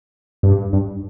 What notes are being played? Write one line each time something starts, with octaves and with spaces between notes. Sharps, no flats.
G2
G2